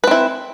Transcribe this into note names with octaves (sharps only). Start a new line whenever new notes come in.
C4 E4 B4